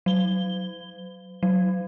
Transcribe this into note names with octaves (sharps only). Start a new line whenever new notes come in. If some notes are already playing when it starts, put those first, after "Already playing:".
F#3 G7
F#3